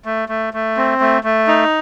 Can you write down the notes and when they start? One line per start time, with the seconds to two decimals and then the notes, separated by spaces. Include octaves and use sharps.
0.05 A3
0.29 A3
0.53 A3
0.77 C4
1.00 A3
1.24 A3
1.47 D#4